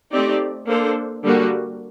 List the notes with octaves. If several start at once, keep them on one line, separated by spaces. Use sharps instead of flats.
A3 C4 D#4 G4 D5
A#3 D4 A4 C5
D3 G3 A#3 F#4